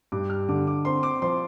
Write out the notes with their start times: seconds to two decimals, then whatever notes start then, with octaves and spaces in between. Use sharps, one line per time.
0.12 G2 D6
0.30 F6
0.48 D3 D6
0.67 D6
0.85 C4 C6
1.03 D6
1.22 F3 C6